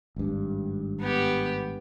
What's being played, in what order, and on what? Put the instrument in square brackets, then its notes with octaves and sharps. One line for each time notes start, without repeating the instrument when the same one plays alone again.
[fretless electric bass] G#1 G2
[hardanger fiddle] B3 G4